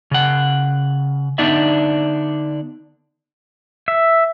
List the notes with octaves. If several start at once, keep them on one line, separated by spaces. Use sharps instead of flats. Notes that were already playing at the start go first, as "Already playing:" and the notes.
C#3 F#5
D3 B3 D4 D#4 D5 E5
E5